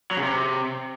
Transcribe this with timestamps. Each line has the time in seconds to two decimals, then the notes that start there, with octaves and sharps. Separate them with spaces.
0.11 F#3
0.17 C#3
0.23 C3